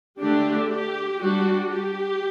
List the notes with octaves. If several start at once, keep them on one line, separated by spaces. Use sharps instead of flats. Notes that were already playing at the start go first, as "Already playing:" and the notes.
D3 A3 D4 G4
G4
G3 D4 F#4
G4